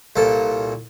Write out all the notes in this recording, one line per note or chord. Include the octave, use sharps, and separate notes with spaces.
C2 A#2 A4